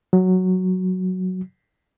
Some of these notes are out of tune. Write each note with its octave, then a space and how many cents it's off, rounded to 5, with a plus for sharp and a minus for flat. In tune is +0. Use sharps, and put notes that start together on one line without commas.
F#3 +0